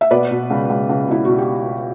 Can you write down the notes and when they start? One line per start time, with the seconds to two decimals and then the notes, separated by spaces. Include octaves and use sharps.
0.01 E5
0.11 B2 B4 D5
0.31 B2
0.50 C#2
0.69 C#2
0.89 C#2
1.08 B2 E4
1.25 B2 F#4
1.38 G4